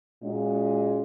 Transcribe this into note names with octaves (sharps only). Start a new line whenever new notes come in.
A#2 G#3 C#4 F#4